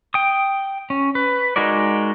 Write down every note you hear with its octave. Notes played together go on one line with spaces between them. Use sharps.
G5 D#6
C#4
B4
G#3 D#4 F#4 A#4 D5